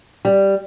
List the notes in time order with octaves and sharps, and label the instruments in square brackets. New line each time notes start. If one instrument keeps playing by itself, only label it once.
[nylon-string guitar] G3